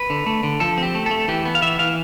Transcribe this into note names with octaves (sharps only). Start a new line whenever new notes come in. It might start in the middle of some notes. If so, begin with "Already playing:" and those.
Already playing: B4
D3
A3
D3
F3 A4
C4 G4
A3
A3 A4
E3 G4
B3
F5
E3 E5
E3 F5